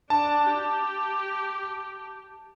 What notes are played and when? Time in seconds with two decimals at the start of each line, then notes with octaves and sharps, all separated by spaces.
0.10 D4 A5
0.46 G4